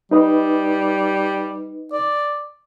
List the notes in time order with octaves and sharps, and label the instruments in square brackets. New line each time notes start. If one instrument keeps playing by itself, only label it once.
[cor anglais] G3 [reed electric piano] D#4 B4 D#5
[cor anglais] D5